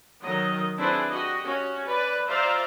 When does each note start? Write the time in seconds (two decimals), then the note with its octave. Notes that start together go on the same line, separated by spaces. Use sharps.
0.21 D#3 F#3 D#5
0.77 C4 D4 E4 G#4 B4 C5
1.08 F#4 G4 D#5
1.44 C#4 F#4
1.86 B4 D5
2.28 F4 C5 D5 E5 F5 A#5